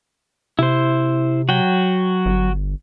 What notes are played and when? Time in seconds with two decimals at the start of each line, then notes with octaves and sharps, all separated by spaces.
0.59 C3 E4 C5
1.49 F#3 F#4 G5
2.26 G1